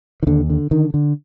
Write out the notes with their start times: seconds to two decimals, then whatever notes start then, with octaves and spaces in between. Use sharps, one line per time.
0.23 D#3
0.27 D#2 D3
0.50 D3
0.71 D3 D#3
0.94 D3